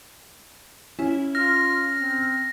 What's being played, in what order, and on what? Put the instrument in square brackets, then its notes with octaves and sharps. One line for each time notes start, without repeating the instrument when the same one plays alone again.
[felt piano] C#4 [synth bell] E4
[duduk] F4 [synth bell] F6 [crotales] A#6
[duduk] C4